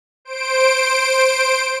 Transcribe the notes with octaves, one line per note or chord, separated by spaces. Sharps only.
C5 D7